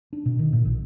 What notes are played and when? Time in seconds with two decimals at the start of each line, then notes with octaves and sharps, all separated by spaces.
0.13 D4
0.26 B2
0.39 D#3
0.53 A#2
0.65 A#1